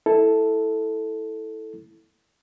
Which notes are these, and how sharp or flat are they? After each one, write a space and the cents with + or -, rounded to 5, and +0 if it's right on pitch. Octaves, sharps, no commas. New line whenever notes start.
E4 -10 A4 +0